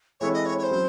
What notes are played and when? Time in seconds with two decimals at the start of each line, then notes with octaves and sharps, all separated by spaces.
0.20 E3 G#3 C4 E4 A4 C#5
0.34 D#5
0.46 C#5
0.59 C#5
0.63 C5
0.71 F#3 C#4